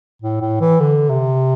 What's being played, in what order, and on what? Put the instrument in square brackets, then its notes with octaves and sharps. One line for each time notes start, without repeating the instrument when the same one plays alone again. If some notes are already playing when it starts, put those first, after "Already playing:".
[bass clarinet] A2
A2
E3
D3
C3